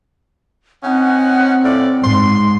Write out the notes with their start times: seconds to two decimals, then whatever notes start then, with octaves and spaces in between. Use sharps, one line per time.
0.84 C4 C#4 D#4 F#5
1.63 A2 F3 D5
2.04 G#2 C6